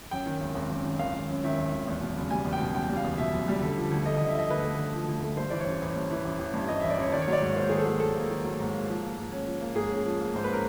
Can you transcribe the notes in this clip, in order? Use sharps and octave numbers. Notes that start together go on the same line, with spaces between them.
F#2 G5
D#3
G#1
G#1
F#2
D#3
G#1 F5
G#1
F#2
D#3 E5
G#1
G#1
E2
B2
F#1
G3 G#5
E2
G5
B2
F#1 G5
G3
F5
E2
B2 E5
F#1
G3
D3
F3
D2
A3 D#5
D3 D#5
E5
F3 D#5
D2 B4
A3
D3
F3
D2
A3
G2 C5
E3 D5
C#5
A1
A1
G2
E3
A1
A1
G2
E3 D#5
A1 E5
D5
A1 C#5
D#3 D5
C#5
F#3 D5
G#2 C#5
A#3 C5
D#3 G#4
A4
F#3
G#2 A4
A#3
D#3
F#3
G#2
A#3
F3
A#3
G#2
C#4
F3
A#3
G#2 G#4
C#4
F3
A#3
G#2 C5
B4
C#4 A#4